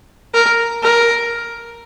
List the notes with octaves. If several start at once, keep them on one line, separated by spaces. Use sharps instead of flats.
A#4
A#4